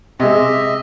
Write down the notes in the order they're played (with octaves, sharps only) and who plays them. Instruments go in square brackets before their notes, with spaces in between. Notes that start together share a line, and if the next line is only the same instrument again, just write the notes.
[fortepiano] C3 G#3 [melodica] D#5 E5